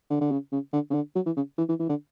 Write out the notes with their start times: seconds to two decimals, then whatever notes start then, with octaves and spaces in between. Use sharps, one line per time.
0.10 D3
0.21 D3
0.31 C#3
0.52 C#3
0.73 D3
0.90 C#3
0.94 D3
1.15 F#3
1.26 E3
1.36 C#3
1.58 E3
1.69 E3
1.79 E3
1.89 D3